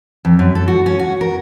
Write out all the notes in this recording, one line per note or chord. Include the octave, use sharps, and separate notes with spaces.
F2
F#2
A4
F#4
C#4
F#4
A#4